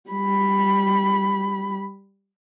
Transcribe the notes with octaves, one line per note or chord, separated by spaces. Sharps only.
G3 B5